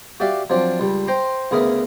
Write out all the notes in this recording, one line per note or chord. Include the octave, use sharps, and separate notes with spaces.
F#4 G4 D5 E5 F5
F3 F#3 C4 D4
C#2 G3
C5 G5 A#5 C6
D2 C#3 B3 G#4 A#4 E5